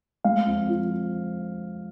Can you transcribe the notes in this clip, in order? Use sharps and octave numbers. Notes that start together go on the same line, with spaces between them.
G#3 F5
F2
F3